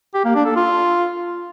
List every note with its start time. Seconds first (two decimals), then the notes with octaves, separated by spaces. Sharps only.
0.14 G4
0.25 A#3
0.35 D4
0.46 A4
0.56 F4